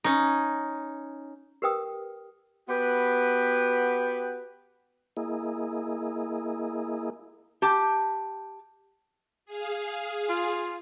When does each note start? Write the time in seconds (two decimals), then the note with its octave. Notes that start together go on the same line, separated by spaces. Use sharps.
0.04 C#4 D#4
1.62 G4 A#4 B4 G5 D#6
2.69 B3 F#4 G4 B4
5.17 A#3 E4 G#4 D#5
7.62 G4 A5
9.46 G#4 F5
10.29 F4